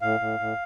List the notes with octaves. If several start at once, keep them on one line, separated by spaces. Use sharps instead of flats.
A2 F5
A2
A2